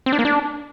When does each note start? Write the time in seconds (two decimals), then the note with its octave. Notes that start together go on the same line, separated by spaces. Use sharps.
0.06 C4
0.13 D4
0.19 A#3
0.25 D4